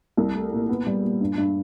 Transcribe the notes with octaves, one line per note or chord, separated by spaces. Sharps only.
C2
A3
A#2
B3
G3
A#2
G2
G2